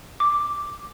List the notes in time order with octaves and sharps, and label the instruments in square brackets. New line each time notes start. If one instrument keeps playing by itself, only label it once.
[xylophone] D6